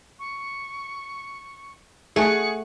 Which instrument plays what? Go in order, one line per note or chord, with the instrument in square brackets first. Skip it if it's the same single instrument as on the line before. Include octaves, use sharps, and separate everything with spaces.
[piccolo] C#6
[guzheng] A3 F#4 [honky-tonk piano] G#4 [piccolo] C#7